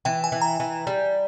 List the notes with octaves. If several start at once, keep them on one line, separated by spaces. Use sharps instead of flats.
E3 G5
G#5
E3
A#5
E3
G3